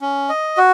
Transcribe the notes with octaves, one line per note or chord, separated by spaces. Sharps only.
C#4
D#5
F#4